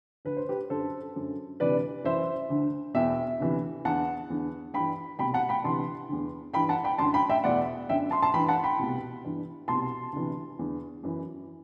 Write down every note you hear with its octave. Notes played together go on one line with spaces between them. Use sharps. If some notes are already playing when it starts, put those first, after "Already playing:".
D2 D3 B4
C5
G4 B4
F#2 D3 A4 C5
F#2 D3
D2 C3 E3 B4 D5
F#2 E3 C5 E5
D2 D3
E2 B2 E5 G5
D2 C3 E3
E2 D3 F#5 A5
E2 D3
G2 E3 G5 B5
C2 B2 G5 B5
F#5 A5
G5 B5
D2 C3 E3 A5 C6
E2 D3
G2 E3 G5 B5
F#5 A5
G5 B5
F#2 D3 A5 C6
G5 B5
E5 G5
E2 B2 D5 F#5
F#2 D3 E5 G5
A5 C6
A5 C6
G2 E3 G5 B5
F#5 A5
G5 B5
C2 B2
G2 E3
C2 B2 A5 C6
D2 C3 E3
E2 D3
F#2 E3